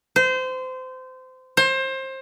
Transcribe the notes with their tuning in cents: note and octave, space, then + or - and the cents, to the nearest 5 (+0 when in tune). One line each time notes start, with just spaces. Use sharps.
C5 -25
C5 +25